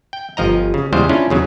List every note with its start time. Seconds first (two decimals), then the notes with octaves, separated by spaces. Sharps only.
0.13 G5
0.37 G1 F3 D#5 A#5
0.74 C#3
0.93 E2 C#3 G3 G#3 C5 F5
1.09 C#4 D4 E4 F4
1.30 E2 C#3 F#3